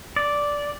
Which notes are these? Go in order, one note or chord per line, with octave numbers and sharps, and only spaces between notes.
D5